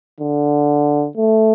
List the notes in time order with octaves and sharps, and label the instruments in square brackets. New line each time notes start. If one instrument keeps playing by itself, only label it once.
[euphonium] D3
A3